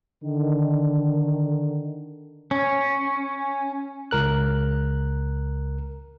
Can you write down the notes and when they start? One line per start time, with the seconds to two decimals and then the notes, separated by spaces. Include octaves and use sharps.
0.23 D3 D#3
2.51 C#4
4.11 C#2 A#4 F#6